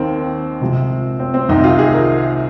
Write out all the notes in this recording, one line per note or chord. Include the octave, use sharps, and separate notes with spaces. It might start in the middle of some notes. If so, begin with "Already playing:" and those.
Already playing: D#2 D#3 A#3 C4
C2 C3 F3 G#3
C4
C4
C2 C3 D#3 D#4
F4
G#4
A#4